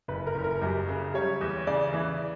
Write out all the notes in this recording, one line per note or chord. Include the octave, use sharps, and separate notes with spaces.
F#1 B4
A#4
F#1
A#4
F#2 G4
C#3
G3 C#5
E2
C#3 D5
E3